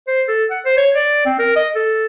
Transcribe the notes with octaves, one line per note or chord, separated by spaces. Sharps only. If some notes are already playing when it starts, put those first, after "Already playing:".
C5
A4
F#5
C5
C#5
D5
C4
A#4
D#5
A4